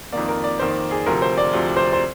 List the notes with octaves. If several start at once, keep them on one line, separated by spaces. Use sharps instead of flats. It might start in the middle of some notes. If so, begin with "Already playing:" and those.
F2 D#3 A#3 D5
A#4
D5
F2 D#3 A#3 C5
G#4
D2 C3 F3 A#4
C5
D5
D2 C3 F3
C5
C5